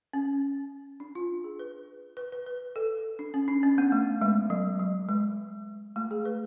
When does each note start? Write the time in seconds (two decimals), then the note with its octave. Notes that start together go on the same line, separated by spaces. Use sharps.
0.13 C#4
1.00 D4
1.15 F4
1.44 G#4
1.59 B4
2.17 B4
2.32 B4
2.46 B4
2.76 A4
3.19 D4
3.34 C#4
3.48 D4
3.63 C#4
3.78 B3
3.92 A3
4.22 G#3
4.50 F#3
4.80 F#3
5.09 G#3
5.96 A3
6.11 G#4
6.25 B4